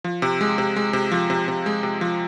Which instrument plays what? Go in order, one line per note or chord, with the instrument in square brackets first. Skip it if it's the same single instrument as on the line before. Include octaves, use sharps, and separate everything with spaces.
[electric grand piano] F3
C3
G#3
C3
G#3
C3
F3
C3
C3
G#3
C3
F3